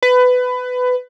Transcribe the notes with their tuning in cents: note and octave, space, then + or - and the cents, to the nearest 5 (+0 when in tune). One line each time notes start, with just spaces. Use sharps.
B4 +20